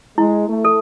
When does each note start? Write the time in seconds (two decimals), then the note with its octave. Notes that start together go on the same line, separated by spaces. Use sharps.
0.18 G#3 E4
0.49 A3
0.65 A4